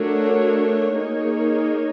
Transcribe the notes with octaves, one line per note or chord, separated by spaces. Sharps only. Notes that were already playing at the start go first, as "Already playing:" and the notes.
Already playing: A3 D4 F#4 A#4 C#5
A#3 D#4 G#4 C#5